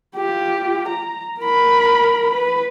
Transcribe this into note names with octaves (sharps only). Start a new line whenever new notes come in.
F4 G4
A#5
A#4 B5
B4